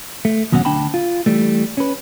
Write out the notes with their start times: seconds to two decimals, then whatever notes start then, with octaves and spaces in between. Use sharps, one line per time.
0.25 A3
0.52 D#2 B2 F#3 C#4 A4 F#5
0.65 D2 D4 G5 A5 B5
0.94 F4
1.26 E3 G3 A3
1.77 C#4 B4